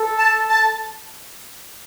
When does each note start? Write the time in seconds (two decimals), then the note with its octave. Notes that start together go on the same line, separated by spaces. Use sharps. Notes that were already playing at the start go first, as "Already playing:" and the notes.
Already playing: A4
0.17 A5
0.49 A5